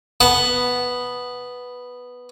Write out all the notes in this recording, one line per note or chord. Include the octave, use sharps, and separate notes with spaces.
B3 A5